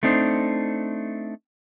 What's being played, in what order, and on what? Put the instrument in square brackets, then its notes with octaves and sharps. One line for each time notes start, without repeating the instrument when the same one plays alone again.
[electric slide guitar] A3 C4 D4 D#4 C5